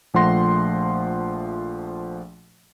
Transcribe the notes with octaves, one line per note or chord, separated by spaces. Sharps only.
A#1 F3 A3 F#5 C6 A#6